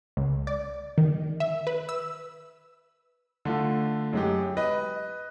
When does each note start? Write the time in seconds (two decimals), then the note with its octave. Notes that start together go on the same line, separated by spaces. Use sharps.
0.17 C#2
0.47 D5
0.98 D#3
1.40 E5
1.67 B4
1.89 E6
3.45 D3 A3 F4
4.13 F#2 G#3 G4
4.57 B4 D#5